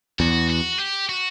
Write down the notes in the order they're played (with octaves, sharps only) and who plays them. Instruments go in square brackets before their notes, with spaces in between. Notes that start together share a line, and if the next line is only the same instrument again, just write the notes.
[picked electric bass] E2 [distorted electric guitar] F#4
[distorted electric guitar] F#4
G4
F#4